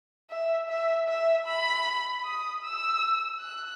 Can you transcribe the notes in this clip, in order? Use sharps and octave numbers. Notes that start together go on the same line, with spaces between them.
E5
E5
E5
B5
D#6
E6
F#6